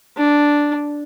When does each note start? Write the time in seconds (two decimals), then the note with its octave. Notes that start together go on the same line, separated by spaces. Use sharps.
0.17 D4